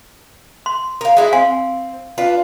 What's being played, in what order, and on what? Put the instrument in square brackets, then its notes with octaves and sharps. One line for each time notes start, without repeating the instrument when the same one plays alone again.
[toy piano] C6
[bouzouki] A#4 F5
G#3 E4 F#4
[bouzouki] C4 [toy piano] F5 G#5 C6
[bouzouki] D4 F4 B4